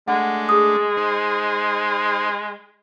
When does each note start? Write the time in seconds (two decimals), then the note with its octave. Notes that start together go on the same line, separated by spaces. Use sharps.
0.08 G#3 A3 D4 F#5
0.49 G#4 D#6
0.97 D#4 C5